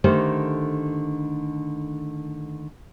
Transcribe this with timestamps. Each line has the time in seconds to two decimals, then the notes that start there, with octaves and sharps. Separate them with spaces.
0.04 D3 D#3 A3 G4 A#4 C5